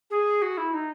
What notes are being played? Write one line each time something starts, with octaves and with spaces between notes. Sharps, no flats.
G#4
F#4
E4
D#4